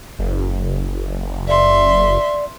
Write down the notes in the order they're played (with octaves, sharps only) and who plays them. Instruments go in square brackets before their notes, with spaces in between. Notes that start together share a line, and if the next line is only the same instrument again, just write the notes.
[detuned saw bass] F#1
[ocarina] D5 [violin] E5 C6